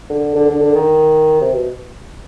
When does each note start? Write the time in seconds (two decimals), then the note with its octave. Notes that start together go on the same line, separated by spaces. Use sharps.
0.10 D3
0.35 D3
0.49 D3
0.62 D3
0.75 D#3
1.41 C3
1.53 B2